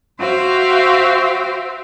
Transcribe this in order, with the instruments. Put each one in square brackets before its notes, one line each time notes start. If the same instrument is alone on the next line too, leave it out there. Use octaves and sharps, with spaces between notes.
[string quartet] F#4 C5 E5 F5 G5